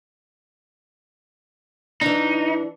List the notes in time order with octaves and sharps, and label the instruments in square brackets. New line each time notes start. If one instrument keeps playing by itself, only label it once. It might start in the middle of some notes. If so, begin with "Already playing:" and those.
[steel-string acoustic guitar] E3 D4 [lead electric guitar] D#4